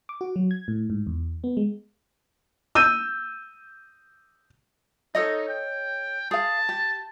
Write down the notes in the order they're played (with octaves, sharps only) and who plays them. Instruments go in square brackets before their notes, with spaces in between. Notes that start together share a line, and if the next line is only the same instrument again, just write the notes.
[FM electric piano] D6
F#4
F#3
G#6
A2
G#2
E2
B3
G#3
[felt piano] E6 G6 D#7
[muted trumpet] D#4 [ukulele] A4 C#5 D#5
[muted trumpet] G5
[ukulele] G#4 F5 [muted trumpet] A5
[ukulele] G4